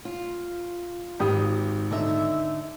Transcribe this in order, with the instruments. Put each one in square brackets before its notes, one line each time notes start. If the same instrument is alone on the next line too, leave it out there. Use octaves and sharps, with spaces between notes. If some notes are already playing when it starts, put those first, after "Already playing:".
[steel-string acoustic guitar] F4
[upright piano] G#1 G4 D#6
[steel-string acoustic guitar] D3 D#4 E5